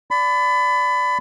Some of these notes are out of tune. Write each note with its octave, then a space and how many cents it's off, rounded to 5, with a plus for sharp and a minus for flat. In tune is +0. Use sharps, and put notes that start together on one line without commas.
D5 -10 B5 +25